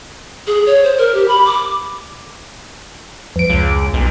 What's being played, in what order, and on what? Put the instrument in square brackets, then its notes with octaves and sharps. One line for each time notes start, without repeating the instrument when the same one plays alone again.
[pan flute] G#4
C#5
C5
A#4
G4
B5
D6
[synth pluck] F2 D7
[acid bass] C#2
B1